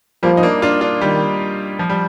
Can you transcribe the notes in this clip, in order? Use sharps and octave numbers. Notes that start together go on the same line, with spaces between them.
F3 G3 A#3
D#4
A#3 D4
D4 F4
D4 F4
D#3 G3
F3
G3